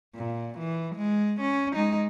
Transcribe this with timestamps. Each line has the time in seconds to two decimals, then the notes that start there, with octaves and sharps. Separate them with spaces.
0.15 A#2
0.59 E3
0.95 G#3
1.41 C#4
1.75 G#3 D#4